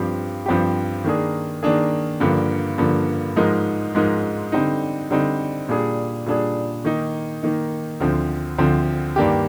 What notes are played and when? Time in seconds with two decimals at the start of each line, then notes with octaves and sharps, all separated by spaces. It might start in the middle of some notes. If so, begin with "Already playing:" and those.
Already playing: G2 F3 C4 G4
0.46 G2 F3 C4 G4
1.04 D#3 A#3 D4 G#4
1.63 D#3 A#3 D4 G#4
2.20 G2 D3 F3 A#3
2.78 G2 D3 F3 A#3
3.36 G#2 F3 G#3 D#4 A#4
3.95 G#2 F3 G#3 D#4 A#4
4.52 D3 G3 C4 D#4
5.11 D3 G3 C4 D#4
5.69 A#2 G3 D4 G#4
6.26 A#2 G3 D4 G#4
6.85 D#3 A#3 D#4
7.43 D#3 A#3 D#4
8.00 D2 D3 F3 C4
8.58 D2 D3 F3 C4
9.16 G2 D#3 A#3 D4 G4